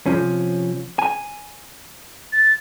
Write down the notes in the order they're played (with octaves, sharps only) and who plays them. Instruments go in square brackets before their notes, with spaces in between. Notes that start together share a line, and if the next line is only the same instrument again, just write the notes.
[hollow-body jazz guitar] C3 F3 C#4
G#5
[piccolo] A6